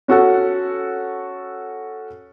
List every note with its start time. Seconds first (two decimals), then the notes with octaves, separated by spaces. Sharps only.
0.08 C#4 F#4 A4 F#5